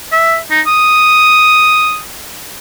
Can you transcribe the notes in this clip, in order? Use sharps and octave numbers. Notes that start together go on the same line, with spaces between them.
E5
D#4
D#6